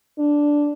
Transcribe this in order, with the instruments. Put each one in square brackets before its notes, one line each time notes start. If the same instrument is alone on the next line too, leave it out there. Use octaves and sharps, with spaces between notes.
[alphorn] D4